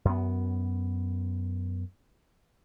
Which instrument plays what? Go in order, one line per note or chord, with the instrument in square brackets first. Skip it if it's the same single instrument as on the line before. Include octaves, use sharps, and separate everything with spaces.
[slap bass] F#2 B3